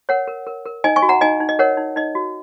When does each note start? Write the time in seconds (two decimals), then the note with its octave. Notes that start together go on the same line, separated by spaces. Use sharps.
0.09 A#4 C#5 F#5
0.28 A#4
0.47 A#4
0.65 A#4
0.84 D#4 D#5 G#5
0.96 G#5 C#6
1.02 F#4
1.09 F#5 A#5
1.21 D#4 D#5 G#5
1.40 D#4
1.49 D#5
1.59 A#4 C#5 F#5
1.77 D#4
1.96 D#4 D#5
2.15 F#4